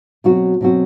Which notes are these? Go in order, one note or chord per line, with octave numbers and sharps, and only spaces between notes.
B2 F#3 C4 F#4
B2 F#3 C4 F#4